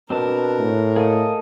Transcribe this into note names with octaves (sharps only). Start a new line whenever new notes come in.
B2 C4 D4 A#4 A5
A2
A#3 G#4 A4 D#5